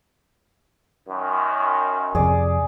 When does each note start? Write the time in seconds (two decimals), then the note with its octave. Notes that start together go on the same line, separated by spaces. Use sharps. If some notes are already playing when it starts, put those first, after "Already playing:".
1.09 F#2 D#3
2.15 F2 C3 G#4 D5